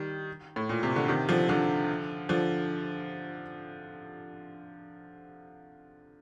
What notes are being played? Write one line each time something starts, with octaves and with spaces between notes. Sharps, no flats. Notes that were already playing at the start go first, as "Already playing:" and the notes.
Already playing: D#3 G3
A2
A#2
C3
D3
C3 D#3
D3 F3
D3 F3
D3 F3